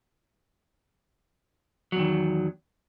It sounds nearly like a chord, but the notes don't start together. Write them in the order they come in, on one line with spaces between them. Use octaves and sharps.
F#3 E2 D#3